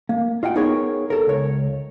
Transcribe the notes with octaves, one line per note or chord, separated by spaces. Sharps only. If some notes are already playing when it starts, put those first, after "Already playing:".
A#3
F4 D#5 F#5 G5
B3 D#4 G#4 A#4 C#5
A4 A#4
C#2 C#5